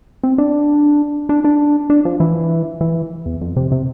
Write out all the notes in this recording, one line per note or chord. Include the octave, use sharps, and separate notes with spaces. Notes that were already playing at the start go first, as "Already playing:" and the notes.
C4
D4
D4
D4
D4
F3
E3
E3
E2
F2
C3
C3